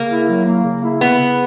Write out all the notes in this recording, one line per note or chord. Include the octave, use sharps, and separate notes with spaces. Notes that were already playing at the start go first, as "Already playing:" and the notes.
Already playing: C#3 A#3
E4
F#3
A#3
C#3
E4
C#3 B3
C#3